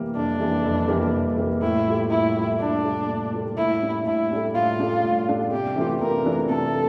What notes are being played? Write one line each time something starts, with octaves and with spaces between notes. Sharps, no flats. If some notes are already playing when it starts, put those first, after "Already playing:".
Already playing: E3 G3 A#3
F2 D4
E3 G3 A#3
F2
E3 G3 A#3
F2
E3 G3 A#3
A2 E4
G3 A#3 F4 A4
A2 E4
G3 A#3 F4 A4
A2 D4
G3 A#3 F4 A4
A2
G3 A#3 F4 A4
A2 E4
G3 D4 A4
A2 E4
G3 D4 A4
A2 F4
G3 D4 A4
A2
G3 D4 A4
C3 G4
E3 A3 D4 F4
C3 A#4
E3 A3 D4 F4
C3 A4
A3